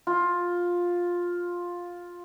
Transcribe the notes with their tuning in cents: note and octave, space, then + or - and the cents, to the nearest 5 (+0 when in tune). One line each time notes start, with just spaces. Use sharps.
F4 +10